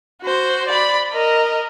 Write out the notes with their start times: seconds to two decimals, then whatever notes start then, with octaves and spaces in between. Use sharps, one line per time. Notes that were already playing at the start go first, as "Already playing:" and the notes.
0.22 F#4 C5
0.68 D5 B5
1.12 A#4 D#5